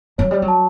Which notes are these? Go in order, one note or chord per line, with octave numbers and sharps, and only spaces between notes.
F#3 C#5
G3 C#5
F#3
A5